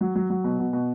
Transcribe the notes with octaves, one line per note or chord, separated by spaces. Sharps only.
F#3
F#3
F#3
B2
B2
B2